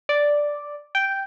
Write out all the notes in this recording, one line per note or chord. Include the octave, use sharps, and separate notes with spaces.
D5
G5